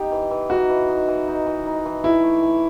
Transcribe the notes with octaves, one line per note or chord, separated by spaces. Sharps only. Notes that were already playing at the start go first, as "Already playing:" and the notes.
Already playing: B3 D#4 G4
E3
E3
D#4 F#4
E3
D#4
E3
D#4
E3
D#4
E3
E3 E4
A3
E3